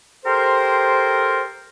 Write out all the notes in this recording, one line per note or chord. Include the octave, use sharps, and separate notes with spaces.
G4 A4 A#4 C5